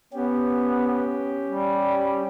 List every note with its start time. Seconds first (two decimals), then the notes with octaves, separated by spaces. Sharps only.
0.13 B3 C#4 G4
1.48 G3